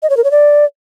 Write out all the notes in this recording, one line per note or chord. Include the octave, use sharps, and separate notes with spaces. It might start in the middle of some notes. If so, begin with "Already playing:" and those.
D#5
C#5
A#4
C#5
D5